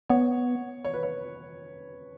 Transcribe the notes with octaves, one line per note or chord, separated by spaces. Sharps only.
B3 C#5
C#5
B4
C#5